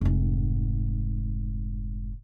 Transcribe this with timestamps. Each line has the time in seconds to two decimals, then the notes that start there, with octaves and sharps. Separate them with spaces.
0.01 F1 G#2